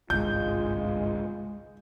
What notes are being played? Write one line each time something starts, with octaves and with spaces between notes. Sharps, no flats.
G1 C2 G#2 G#3 F4 G6